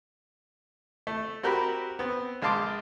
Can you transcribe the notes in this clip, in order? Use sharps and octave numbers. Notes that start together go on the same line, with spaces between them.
A3
C4 F#4 G4 A#4 B5
B3 C4
A#1 G#3 F5 A5 C6 D6